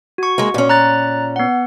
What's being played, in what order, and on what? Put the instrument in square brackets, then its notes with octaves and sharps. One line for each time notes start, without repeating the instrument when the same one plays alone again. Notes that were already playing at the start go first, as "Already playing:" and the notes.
[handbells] F#4 C#6
[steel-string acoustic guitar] G#3 A#3
A#2 C#4
[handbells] A#5 F#6 A6
B3 F#5